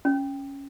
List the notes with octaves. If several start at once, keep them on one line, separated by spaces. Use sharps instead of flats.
C#4